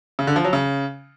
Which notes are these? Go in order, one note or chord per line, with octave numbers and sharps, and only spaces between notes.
C#3
D3
F3
F#3
C#3